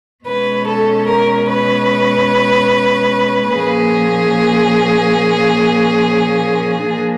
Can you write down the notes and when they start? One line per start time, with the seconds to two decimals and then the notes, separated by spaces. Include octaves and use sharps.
0.25 B2 G#3 C#4 B4
0.66 A4
1.07 A#4
1.49 B4
3.54 A#2 F3 A#3 C#4 G#4
6.84 F3 A#3 D4